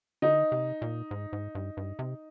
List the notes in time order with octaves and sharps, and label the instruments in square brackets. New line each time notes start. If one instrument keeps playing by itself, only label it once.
[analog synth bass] D3 [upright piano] D#4
[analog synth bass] C3
A#2
G#2
G#2
G2
G2
C3